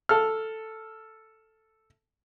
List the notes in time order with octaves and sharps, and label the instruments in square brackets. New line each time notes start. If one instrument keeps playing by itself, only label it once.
[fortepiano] A4 F6